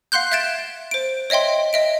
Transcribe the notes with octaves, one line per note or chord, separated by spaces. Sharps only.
F5 F#5 C6 F#6 G6
E5 F#6 G#6 A6 D7 E7
C5 D7
C#5 D#5 E5 G5 C6
D#5 E5 D7